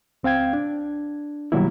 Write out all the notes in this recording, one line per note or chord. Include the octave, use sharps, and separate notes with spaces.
C#2 C4 F5 G5 G#6
D4
B2 D#3 F#3 G3 A#3 E4